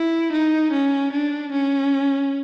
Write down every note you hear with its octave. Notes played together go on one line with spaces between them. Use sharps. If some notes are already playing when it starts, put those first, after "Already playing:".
Already playing: E4
D#4
C#4
D4
C#4